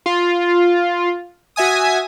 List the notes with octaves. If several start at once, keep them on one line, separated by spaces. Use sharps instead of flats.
F4
F#4 E5 G#5 D#6